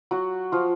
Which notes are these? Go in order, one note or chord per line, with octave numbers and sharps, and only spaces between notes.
F#3 F#4
F3 F4